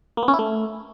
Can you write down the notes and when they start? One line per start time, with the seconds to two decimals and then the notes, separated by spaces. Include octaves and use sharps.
0.17 A#3
0.23 B3
0.28 C#4
0.33 E4
0.39 A3